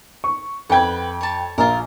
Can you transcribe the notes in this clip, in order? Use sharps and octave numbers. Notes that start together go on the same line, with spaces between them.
C#6
F2 B4 F#5 G5 G#6
C#5 A5
A#1 F4 A#4